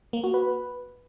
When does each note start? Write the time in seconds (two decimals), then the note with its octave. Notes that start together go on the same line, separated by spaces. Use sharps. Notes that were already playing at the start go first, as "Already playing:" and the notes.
0.13 A#3
0.24 F#4
0.34 B4